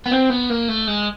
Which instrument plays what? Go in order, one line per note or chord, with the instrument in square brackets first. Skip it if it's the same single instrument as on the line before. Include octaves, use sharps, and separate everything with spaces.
[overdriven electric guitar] B3
C4
B3
A#3
A3
G#3